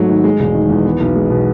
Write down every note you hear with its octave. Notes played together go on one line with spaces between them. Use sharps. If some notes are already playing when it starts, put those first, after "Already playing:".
Already playing: G#2 F#3 A3
D#3
G#3
E1
D#3
E2
B3
B1
G#3
B2